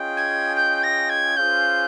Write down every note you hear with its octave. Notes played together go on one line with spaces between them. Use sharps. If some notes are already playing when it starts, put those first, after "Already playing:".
Already playing: C#4 F4 G#4 D#5 G5
G#6
G6
A#6
G#6
C#4 F4 G#4 C5 F5 G6